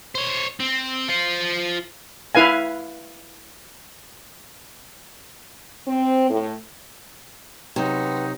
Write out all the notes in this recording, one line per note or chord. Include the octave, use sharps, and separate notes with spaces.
C5 C#5
C4
F4 C5
E4 B4 F5 G#5
C4
A2
C3 F#3 D#4 B4 F#5 G5 C6